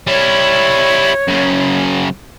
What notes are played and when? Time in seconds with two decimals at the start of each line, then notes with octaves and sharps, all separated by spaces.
0.07 G3 E4 C#5
1.28 F#2 C#3